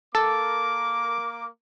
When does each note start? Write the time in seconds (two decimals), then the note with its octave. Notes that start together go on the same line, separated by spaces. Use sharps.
0.15 A#3 A4 A#4 D6